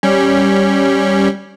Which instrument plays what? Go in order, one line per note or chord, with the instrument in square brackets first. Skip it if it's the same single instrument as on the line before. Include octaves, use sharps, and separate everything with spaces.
[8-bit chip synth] G3 C#4